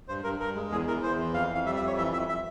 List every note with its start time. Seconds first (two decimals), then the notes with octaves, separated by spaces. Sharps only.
0.08 G2 C5
0.24 G2 A#4
0.39 G2 A#4
0.55 G#3
0.71 E2 G#4
0.87 E3 A#4
1.03 E2 C5
1.18 E3
1.34 F2 F5
1.49 F2
1.55 F5
1.66 G3 E5
1.76 E5
1.81 F2
1.87 C#5
1.97 E3 E5
2.13 F2 E5
2.29 E5